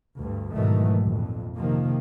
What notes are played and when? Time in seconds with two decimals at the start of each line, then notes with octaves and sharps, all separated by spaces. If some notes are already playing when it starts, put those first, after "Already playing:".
0.19 D2 G2
0.55 G#2 B2 D#3 E3 F#3 A3
1.04 A#1 F2
1.56 C3 D#3 F3 A#3